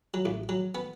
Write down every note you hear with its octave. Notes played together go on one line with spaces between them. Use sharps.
F#3
A1
F#3
B3